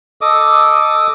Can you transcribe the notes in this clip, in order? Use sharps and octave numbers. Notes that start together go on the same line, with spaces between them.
A4 D#5 D6 D#6